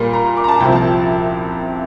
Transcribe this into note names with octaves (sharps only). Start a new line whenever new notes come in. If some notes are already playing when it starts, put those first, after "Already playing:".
Already playing: A#2 G3 A#3
A#5
D6
A#5
A5
C2 C3 F3 G5
A5